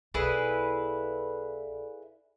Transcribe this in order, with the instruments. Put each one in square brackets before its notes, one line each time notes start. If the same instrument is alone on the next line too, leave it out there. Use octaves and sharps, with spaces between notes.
[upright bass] B1 F4 [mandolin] E4 G#4 B4 [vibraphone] A4 D5 F5